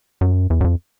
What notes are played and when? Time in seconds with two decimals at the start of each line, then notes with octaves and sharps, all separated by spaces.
0.21 F#2
0.50 E2
0.61 F#2
0.64 F2